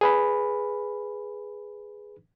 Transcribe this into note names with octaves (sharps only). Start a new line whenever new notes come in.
G#4 B4 B5